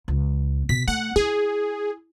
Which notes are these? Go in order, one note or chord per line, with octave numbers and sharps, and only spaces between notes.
C#2
B2 B6
A3 F#5
E4 G#4